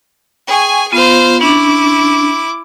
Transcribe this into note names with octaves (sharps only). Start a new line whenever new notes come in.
G#4 G5 G#5 C#6
B3 F4 C5 F5
C#4 D4 E4 D6